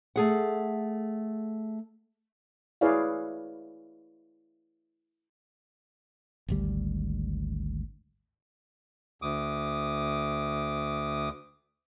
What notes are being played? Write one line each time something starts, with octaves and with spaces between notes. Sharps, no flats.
A3 G#4 F#5
E4 G#4 B4 C#5 D5 F5
G#1 D2 G3
D2 D6 D#6